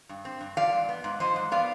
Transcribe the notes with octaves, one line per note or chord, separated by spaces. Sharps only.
G2
C4
G2
F3 D5 F5
G#2
B3
G#2
F3 C5 D#5
G#2
B3 D5 F5